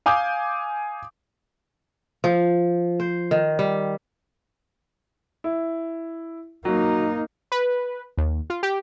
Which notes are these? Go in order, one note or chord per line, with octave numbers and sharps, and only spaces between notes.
F5 G#5 D6 D#6 G6
F3
C5
D#3
G3
E4
F#3 A#3 D#4
B4
D#2
F4
G4